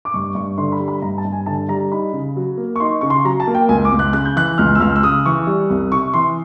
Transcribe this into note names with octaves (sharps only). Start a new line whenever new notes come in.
D6
G2 C#6
G2 C#6
D3 C6
B5
G3
B5
G2 A#5
A5
G2
G#5
D3 A5
G3 A#5
D#4 B5
C#3
F#3
A#3
C#6
D#4 C6
C#3 C#6
C6
F#3 A#5
A5
A#3
G5
C#2 G#5
D6
C#2
F#6
C#3 F#6
G6
E3 F#6
C#2 F6
E6
C#2 F6
E6
C#3 D#6
E3 C#6
G3
C2
C3 C#6
E3 C6